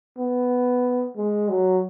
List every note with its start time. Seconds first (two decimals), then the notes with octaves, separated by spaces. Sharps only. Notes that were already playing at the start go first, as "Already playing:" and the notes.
0.18 B3
1.16 G#3
1.49 F#3